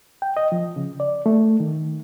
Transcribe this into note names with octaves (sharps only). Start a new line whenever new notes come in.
G5
D#5
F3
C#3
D5
A3
D#3